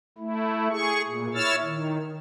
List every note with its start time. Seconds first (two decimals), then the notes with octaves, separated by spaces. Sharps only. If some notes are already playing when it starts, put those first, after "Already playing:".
0.18 A3 E4
0.71 G#4 C#6
1.05 A#2
1.34 E4 C#5 E6 F6 A6
1.63 D#3